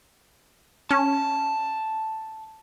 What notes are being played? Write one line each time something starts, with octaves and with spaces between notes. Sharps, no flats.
C#4 A5